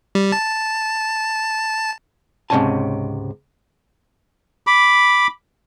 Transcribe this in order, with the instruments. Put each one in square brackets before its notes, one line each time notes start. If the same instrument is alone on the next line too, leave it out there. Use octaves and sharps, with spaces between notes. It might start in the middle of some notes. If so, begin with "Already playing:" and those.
[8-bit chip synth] G3
A5
[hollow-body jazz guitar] C#2 G#2 C3 C#4 G#5 A5
[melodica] B5 D6